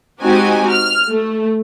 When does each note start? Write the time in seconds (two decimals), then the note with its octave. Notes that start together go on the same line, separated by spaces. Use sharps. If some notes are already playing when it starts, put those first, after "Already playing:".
0.23 G#3 C4 D#4 F#4 G4 G#5
0.71 F6
1.10 A3